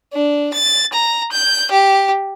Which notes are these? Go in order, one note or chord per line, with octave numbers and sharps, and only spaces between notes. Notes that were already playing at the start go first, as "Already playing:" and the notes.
D4
A6
A#5
G6
G4